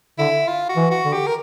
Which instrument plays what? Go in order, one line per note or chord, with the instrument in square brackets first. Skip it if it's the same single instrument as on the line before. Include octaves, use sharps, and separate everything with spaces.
[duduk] D3 [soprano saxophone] E4
[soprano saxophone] F4
F#4
[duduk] E3
[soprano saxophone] F#4
[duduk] D3
[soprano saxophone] G4
A#4